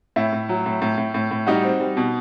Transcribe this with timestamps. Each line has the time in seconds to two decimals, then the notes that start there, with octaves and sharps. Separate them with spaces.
0.16 A2 E4
0.33 A2
0.49 F#3
0.66 A2
0.82 A2
0.98 A2
1.14 A2
1.31 A2
1.47 G3 D#4 F#4
1.64 C4
1.80 G3
1.97 B2